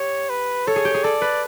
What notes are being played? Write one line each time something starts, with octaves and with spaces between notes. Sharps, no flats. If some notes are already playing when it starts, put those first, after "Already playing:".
Already playing: G4 C#5
B4
A4 C#5
G#4
G4
G#4
A4 D5
B4